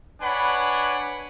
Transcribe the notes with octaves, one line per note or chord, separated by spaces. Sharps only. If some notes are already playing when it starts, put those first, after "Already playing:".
D4 B4 C#5 F#5 G#5 B5